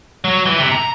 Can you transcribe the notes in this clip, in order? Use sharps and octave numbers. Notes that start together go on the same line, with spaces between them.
F#3
E3
C3
A#5